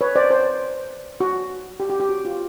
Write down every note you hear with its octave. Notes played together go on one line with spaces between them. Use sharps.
B4 C#5
C5 D5
C5
F#4
G4
G4
G4
F#4
F4